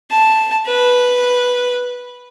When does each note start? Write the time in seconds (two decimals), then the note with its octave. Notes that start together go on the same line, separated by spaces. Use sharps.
0.11 A5
0.67 B4